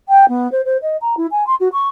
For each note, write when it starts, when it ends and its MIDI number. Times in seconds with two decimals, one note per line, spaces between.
0.09 0.25 79
0.29 0.50 59
0.52 0.61 72
0.65 0.77 72
0.82 0.97 75
1.01 1.15 82
1.17 1.26 64
1.31 1.47 80
1.47 1.55 84
1.60 1.68 66
1.73 1.89 85